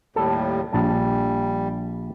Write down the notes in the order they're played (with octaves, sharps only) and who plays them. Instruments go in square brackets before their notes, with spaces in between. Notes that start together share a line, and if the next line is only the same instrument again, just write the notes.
[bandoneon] D#2 A2 G3 [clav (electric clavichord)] A4
[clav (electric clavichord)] A#1 A5 [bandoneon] G3